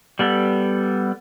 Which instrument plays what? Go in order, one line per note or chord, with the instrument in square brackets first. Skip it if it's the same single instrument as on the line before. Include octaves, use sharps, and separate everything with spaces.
[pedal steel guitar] G3 B3 A4